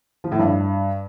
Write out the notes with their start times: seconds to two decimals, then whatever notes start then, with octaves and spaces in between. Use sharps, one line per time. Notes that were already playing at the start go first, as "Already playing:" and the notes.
0.24 F3
0.32 A2
0.39 G2